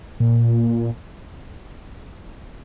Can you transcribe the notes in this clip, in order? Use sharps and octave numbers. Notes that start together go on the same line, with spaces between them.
A#2